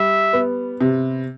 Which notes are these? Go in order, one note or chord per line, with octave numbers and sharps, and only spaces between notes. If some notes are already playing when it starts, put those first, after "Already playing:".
Already playing: G3 E5
B3
C3